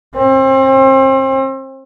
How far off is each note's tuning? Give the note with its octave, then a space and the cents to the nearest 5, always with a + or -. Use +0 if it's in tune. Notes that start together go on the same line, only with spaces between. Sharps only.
C4 +35